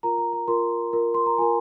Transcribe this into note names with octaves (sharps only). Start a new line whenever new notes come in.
F4 A#4 A#5
A#5
A#5
F4 A#4 C6
F4 A#4
C6
A#5
F4 A#4 G#5